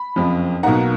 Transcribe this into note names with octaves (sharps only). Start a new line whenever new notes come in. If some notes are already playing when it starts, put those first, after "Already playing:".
Already playing: B5
F#1 F2 F3
B1 B2 A#3 D#4 F#5 A#5